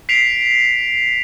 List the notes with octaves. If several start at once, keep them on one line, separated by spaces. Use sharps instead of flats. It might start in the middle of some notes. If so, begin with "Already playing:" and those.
B6 C7 D7 F7